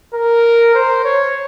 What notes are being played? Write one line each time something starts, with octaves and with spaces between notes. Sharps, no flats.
A#4
C5
C#5